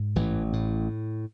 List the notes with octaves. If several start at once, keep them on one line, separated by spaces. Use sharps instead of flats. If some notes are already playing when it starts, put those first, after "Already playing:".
Already playing: G#2
A1 E3
A2